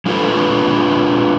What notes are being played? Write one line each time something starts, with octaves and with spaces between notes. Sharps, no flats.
G#3 D4 F4 A4 B4